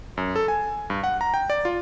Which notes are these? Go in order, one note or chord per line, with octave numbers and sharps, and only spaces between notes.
F#2
A4
G#5
G2
F#5
A#5
G5
D5
F4